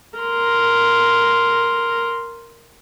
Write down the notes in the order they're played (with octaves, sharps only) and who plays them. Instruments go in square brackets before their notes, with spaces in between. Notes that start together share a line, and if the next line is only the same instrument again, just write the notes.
[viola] A#4 C6